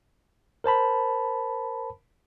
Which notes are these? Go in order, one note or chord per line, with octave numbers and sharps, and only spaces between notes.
A#4 C5 A5 B5